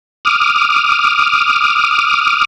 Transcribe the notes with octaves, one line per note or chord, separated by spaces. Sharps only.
D6 D#6 F6